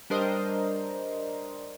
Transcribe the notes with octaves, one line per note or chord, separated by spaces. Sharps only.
G3 D4 A#4 C5 D#5